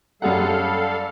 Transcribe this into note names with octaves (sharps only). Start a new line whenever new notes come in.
F#2 G3 G#4 A4 F5 F#5